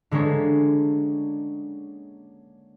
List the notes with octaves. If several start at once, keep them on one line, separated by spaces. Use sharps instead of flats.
D3 G#3 A#3 C#4 D4